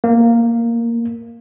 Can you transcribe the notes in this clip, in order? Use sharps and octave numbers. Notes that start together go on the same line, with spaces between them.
A#3